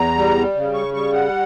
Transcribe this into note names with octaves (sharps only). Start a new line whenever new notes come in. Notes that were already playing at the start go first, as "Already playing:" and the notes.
Already playing: E2 A#5
G3
C#3
C#6
G3 C#6
F#5